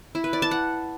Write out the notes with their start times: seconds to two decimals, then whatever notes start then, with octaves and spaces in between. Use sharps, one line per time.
0.15 E4
0.24 B4
0.33 D5
0.42 A5
0.51 F#5